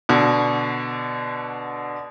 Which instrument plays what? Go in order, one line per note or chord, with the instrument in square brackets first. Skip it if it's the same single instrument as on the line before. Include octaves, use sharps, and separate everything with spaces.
[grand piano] B2 D3